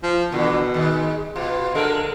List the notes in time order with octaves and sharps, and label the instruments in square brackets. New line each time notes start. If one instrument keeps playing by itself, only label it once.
[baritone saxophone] F3
[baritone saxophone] B2 [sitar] D3 E3
[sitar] D#3 G#3
[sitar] B2 [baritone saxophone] F4
[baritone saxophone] D3 [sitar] G#3 A4 A#4